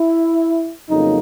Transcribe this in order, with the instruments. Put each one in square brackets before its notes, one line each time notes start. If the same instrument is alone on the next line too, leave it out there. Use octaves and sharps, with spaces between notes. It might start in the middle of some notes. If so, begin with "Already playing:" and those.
Already playing: [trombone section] E4
F2 C#3 F#3 A#3 D#4